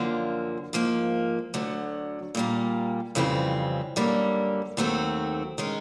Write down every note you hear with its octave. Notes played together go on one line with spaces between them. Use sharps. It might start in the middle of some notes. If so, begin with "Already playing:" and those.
Already playing: F#2 D3 F3 A#3
G#2 F3 A#3
D2 D3 F#3
A#2 G3 A#3
F2 C#3 E3 G3 C4
F#2 D3 G3 A#3
D#2 D#3 F#3 A3 C4
D#3 G#3 C#4